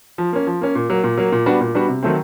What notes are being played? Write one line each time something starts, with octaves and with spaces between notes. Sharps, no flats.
F3
A#3 C#4
F3
A#3 C#4
A#2
F#3 A#3
A#2
F#3 A#3
A#2
G3 B3 D4 F#4
A#2
G3 B3 D4 F#4
C3
D#3 F#3 A3 C4